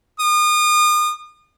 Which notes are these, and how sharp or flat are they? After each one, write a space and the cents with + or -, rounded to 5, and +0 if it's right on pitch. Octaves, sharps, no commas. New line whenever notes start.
D#6 -35